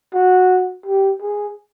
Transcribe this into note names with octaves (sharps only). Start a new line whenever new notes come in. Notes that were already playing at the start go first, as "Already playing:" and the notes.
F#4
G4
G#4